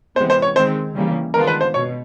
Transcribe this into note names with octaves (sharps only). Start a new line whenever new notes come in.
C3 E3 G#3 B3 C5
C5
C#5
D#3 G#3 C4 C5
C#3 E3 G3 A#3
D#3 G#3 B3 D4 F4 A#4
B4
C5
B2 C#5